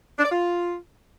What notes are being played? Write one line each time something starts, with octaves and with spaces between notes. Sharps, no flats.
D4
D5
F4